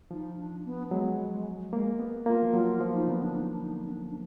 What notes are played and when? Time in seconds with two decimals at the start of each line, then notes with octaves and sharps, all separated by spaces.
0.11 F3 D#4
0.37 D4
0.65 B3
0.91 F#3 G#3
1.73 G#3 A#3
1.99 A#3 B3
2.26 A#3 F4
2.43 F3
2.54 F#3 F4
2.80 F3
2.94 D#4
3.08 D3 B3
3.23 D4
3.35 D#4
3.54 D4
3.61 D#4
3.85 B3
3.89 D4
4.10 D4